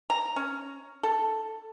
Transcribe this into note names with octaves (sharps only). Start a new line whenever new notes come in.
A#5
C#4
A4